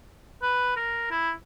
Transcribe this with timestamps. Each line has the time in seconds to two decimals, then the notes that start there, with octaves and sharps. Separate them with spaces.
0.42 B4
0.76 A#4
1.11 E4